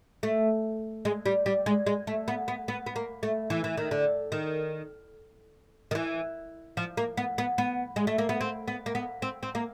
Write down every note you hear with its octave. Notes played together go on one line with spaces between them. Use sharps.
A3
G#3
G3
G3
G#3
G#3
A3
B3
B3
B3
B3
A#3
A3
E3
E3
D#3
D3
D#3
D#3
E3
F3
A#3
B3
B3
B3
G#3
A3
A#3
B3
C4
B3
A#3
B3
C4
C4
A#3